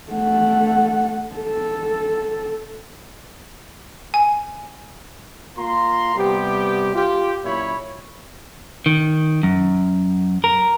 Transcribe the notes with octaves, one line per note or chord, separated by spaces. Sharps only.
A3 F#5
A4
G#5
A#3 F4 A#5 C6
C3 G3 B3 G4
F4 G4
F#2 A#2 E4 C#5 B5
D#3
F#2
A#4